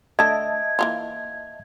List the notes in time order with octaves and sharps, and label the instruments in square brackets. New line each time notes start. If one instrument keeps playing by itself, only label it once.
[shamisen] D3 A3 [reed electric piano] D#5 E5 A5 [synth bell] G#6
[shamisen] E3 A#3 F4